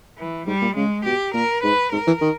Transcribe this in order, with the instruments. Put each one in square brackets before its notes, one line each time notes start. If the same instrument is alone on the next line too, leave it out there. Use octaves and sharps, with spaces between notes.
[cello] E3
[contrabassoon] G#2 [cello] G3
[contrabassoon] A#2
[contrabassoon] C#3 [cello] G#3
[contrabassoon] B2 [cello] G4
[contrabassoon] A#2 [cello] A#4
[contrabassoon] G#2 [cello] B4
[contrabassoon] G#2 [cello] A#4
[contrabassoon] E3
D#3